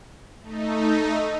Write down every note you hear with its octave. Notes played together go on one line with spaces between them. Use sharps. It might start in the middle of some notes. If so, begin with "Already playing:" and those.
A3 D#4